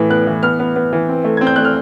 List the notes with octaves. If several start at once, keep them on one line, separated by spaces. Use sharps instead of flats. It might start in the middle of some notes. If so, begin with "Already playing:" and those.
Already playing: A2 E3
B3 F#6
E3
B3 F6
B3
B3
E3
C4
A3
C4 G#6
G6
A3 F#6
F6